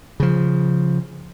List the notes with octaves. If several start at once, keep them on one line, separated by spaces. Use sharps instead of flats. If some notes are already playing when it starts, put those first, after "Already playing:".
C#3 F3